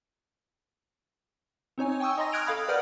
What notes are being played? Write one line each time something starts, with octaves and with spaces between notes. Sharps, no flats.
C4 D#4 C#5 G#5
G5 G#5 C#6 D#6 E6
D#5 A#5 C6 A#6
D#6 F6 F#6 G#6 D7 F7
A4 F5 B5 D#6
A#4 B4 D5 F#5 F6 G6